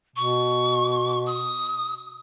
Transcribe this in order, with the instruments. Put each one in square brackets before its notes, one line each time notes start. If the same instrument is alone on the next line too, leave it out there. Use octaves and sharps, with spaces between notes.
[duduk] B2 [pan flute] C#6
[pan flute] D#6